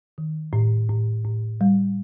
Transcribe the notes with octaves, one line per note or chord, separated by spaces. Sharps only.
D#3
A2
A2
A2
G3